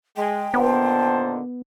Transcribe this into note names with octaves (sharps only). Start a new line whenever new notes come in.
G#3 G5
A#2 D3 D#3 B3 C5 A5